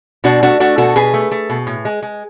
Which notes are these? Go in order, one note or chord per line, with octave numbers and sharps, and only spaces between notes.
B2 D4 F#4
A3 D4 F#4
A3 D4 F#4
B2 F#4 A4
B2 G#4 B4
A3
A3
B2
A2
G#3
G#3